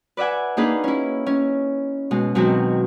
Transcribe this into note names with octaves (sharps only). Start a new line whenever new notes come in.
B4 D5 E5 F#5 G#5
A#3 D4 D#4 G#4 B4
C#4 E4
C#4
B2 G#3
B2 D#3 F#3 G#3 C4